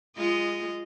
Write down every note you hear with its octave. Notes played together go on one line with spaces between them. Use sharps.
G#3 F4 D#5